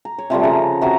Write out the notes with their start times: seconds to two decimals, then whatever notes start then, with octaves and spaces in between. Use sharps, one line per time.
0.05 A#5
0.18 C#5
0.30 C3 F3 G3 A3
0.43 C#3 A#5
0.82 C3 F#4 A#5 C#6